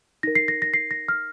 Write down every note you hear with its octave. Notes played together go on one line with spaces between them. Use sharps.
D#4 A#4 A#6
C7
A#6
A#6
C7
A#6
F6